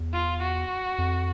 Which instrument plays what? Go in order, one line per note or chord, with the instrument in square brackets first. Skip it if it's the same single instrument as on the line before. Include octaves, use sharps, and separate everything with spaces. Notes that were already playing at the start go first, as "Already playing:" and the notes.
Already playing: [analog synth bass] E2
[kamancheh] F4
F#4
[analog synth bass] F2